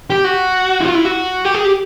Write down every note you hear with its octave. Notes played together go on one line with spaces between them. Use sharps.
G4
F#4
E4
F4
E4
F#4
G4
G#4
G4